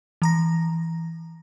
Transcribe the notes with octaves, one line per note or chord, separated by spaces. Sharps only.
E3 A#5 A#6